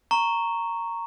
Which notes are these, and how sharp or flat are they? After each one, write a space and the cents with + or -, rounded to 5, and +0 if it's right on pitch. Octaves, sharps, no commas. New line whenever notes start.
A#5 -10 C#6 +0